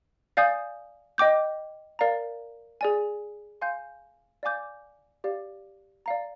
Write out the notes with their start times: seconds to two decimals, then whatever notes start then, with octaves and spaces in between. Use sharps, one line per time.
0.37 D5 F5 G#5 D#6 G6
1.18 D#5 G5 D6 G6
1.99 A#4 D5 F5 A#5
2.81 G#4 D5 G#5
3.61 F5 G#5 C6 G6
4.43 D5 F5 G#5 D6 G6
5.24 G4 D5 F5
6.06 D5 F5 A#5